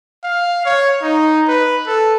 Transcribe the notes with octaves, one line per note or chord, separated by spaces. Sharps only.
F5
C#5
D#4
B4
A4